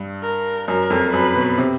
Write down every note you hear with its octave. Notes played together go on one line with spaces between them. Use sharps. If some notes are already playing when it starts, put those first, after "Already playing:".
Already playing: G2
A#4
F#2 A#4
F2
F#2 B4
B2
C3